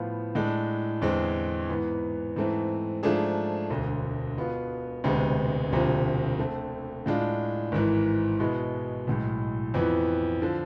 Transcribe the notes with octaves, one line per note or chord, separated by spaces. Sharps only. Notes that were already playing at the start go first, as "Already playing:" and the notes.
Already playing: A2 F3 B3 F4
A2 G#3 D4 A4
E2 D3 G#3 C4
G#2 E3 B3
G#2 E3 A3 C4
G#2 F3 A3 D4 G#4
E1 D2 D3
B2 B3 F4
E1 D2 C3 G#3 B3
E1 D2 C3 F3
D3 A3 C4
A2 G#3 D4 F4
G#1 G#2 E3
B2 G#3 B3 E4
B1 A2 G#3
F2 E3 B3
D3 F3